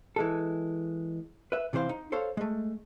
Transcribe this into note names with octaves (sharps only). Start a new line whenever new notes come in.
E3 G#3 A4
B4 E5
C3 E3 C4 C5 F5
D#4
A4 C5 C#5 F5
G#3 A3